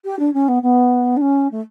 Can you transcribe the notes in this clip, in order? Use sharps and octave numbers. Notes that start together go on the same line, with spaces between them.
G4
D4
C#4
B3
B3
D4
C#4
A3